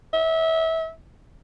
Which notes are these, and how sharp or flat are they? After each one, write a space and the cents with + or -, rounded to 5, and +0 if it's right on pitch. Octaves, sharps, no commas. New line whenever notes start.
E5 -30